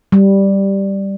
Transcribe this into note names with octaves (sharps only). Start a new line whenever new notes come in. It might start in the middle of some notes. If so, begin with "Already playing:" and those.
G3